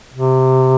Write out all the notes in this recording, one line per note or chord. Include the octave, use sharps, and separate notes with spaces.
C3